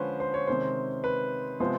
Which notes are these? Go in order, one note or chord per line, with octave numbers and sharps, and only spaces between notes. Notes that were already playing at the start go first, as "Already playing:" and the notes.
Already playing: D3 F3 G#3 C#4 B4 C5
C5
C#5
C3 D#3 G#3 C#4 C5
B4
C3 F3 G#3 B3 C5